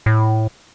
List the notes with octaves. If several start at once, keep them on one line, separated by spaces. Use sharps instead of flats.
A2